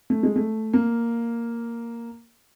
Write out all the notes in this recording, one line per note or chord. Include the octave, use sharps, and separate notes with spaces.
A3
G#3
A3
A#3